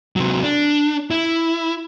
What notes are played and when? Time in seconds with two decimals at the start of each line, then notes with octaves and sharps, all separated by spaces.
0.16 C3 F#3
0.43 D4
1.11 E4